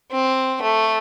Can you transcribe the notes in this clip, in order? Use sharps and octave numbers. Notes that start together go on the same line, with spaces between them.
C4
A3